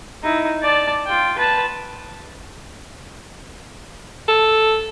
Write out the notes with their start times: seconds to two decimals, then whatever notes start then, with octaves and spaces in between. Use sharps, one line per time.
0.23 D#4 E4
0.62 D5 A5
1.07 F4 G5
1.37 B4 A5
4.28 A4